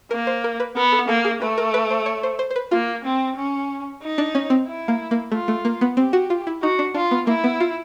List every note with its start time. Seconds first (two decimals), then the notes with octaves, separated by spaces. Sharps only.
0.11 A#3 A#4
0.27 C5
0.44 A#4
0.60 B4
0.76 B3 A#4
0.92 A4
1.08 A#3 A4
1.25 G#4
1.41 A3 B4
1.58 A#4
1.74 B4
1.90 C5
2.06 C#5
2.23 C5
2.39 C5
2.51 C5
2.56 B4
2.71 A#3 F4
3.05 C4
3.36 C#4
4.02 D#4
4.18 D4
4.35 C#4
4.50 C4
4.68 E4
4.88 A#3
5.11 A#3
5.32 A3 F4
5.48 A3
5.65 A#3
5.81 B3
5.97 C4 G4
6.13 F#4
6.30 F4
6.47 E4
6.62 D#4 F#4
6.79 D4
6.94 D4 F4
7.11 B3
7.27 A#3 E4
7.44 B3
7.60 F4